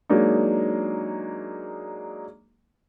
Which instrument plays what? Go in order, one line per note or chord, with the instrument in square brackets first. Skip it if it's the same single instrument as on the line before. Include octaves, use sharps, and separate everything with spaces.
[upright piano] F#3 G#3 A#3 D4 D#4